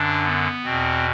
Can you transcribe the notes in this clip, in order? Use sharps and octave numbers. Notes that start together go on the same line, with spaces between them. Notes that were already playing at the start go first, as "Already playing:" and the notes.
Already playing: F#2 D3 D4
B3
E2 B2 C4